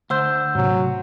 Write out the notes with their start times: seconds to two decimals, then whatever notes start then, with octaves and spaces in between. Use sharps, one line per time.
0.10 D2 C5 F#5 E6 G6
0.55 G#2 C3 F#3 C4